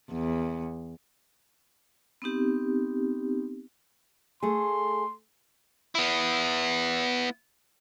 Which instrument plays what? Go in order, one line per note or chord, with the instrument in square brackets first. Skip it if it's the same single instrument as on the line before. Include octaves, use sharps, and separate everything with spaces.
[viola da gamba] E2
[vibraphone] B3 C4 D#4 G4
[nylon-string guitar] A3 G#4 [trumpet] C6
[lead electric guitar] B3 E4